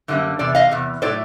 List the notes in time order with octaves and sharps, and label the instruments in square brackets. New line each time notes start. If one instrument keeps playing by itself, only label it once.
[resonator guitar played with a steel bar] F#2 D3 G3 A#3
E2 C3 D5
D#5 F5
E2 C3
A2 F#3 A3 C5 D5